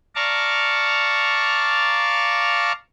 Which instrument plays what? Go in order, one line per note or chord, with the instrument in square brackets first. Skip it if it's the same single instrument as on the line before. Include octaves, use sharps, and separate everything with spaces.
[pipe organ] D5 F5 A5 A#5 C#6